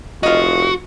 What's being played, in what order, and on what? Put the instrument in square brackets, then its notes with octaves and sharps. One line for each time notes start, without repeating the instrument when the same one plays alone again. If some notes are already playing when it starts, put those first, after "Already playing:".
[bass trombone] F1 [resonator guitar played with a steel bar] F4 D#5 [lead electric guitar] F#4